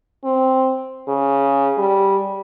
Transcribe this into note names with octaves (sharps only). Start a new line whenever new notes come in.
C4
C#3
G3